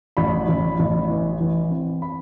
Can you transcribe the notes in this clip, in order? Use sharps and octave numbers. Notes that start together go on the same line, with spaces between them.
A1 B5
A1
A1
E3
E3
C4
B5